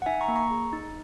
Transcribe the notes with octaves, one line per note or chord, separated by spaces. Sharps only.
F#5
D#4 E5 G#5
A#5 C#6
A#3
A#5 C#6
G#4
D#4